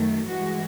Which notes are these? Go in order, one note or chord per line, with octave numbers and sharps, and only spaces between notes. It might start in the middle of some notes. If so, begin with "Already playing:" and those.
Already playing: F#2 D#3 F#3 A3
G2 E3 G#3 F#4